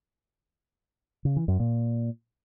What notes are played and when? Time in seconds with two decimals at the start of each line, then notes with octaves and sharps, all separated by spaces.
1.25 C#3
1.36 E3
1.48 F#2
1.60 A#2